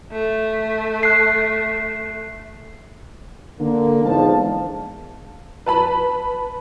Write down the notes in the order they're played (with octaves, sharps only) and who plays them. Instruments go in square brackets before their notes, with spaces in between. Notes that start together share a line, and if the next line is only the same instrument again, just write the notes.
[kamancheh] A3
[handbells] F#6 C7
[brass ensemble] D3 A#3
E2 G#2 F3 D4 F5 A5
[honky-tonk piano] B4 A5 B5